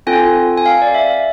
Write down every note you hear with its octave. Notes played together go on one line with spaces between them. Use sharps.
C4 F4 A4 G#5
G#5
F5
D5
E5